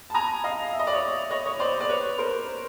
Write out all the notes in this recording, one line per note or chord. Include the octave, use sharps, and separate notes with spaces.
A5
G#5 A#5
D#5 F5
E5
D#5
D5
C#5 D#5
C#5 D#5
C#5 D#5
C5 D5
D5
B4 C#5
A#4 C5